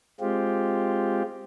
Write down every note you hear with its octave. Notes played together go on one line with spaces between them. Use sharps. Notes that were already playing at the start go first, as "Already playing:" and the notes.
G#3 C4 F4 G4